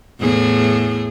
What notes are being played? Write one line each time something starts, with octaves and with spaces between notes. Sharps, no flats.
E2 A2 G#4